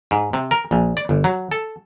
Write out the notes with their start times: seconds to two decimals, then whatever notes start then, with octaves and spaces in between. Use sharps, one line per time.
0.11 G#2
0.33 C3
0.51 A#4
0.71 A#1
0.97 D5
1.09 G1
1.24 F#3
1.51 A4